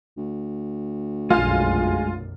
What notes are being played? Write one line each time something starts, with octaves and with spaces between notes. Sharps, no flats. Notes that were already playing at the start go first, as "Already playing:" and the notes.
D2
F1 B1 F#2 G#3 F4 F6